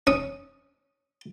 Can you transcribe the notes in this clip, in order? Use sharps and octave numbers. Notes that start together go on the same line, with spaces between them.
C#4 D#6